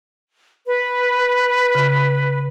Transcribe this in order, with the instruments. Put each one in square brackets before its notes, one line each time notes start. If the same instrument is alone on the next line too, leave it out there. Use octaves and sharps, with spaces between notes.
[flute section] B4
[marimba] C#3